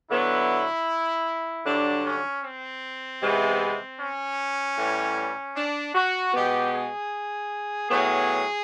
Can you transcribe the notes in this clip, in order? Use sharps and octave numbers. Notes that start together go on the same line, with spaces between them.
D3 F#3 B3 E4
G2 D3 F#3 D4
C#4
C4
C3 E3 G#3 B3
C#4
A2 E3 G3
D4
F#4
B2 G#3 B3 G4
G#4
A2 F#3 B3 G#4